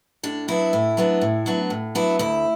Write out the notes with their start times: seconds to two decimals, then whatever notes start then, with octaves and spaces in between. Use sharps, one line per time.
0.23 A2 D4
0.48 F#3 B3 D4 E4
0.73 A2
0.97 F#3 B3 D4
1.21 A2
1.46 F#3 B3 D4
1.70 A2
1.95 F#3 B3 D4 E4
2.19 D2 E4